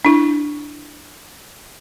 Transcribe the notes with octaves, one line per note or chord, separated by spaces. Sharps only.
D4 E4